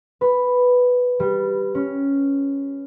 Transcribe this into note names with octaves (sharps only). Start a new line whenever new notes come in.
B4
G3
C#4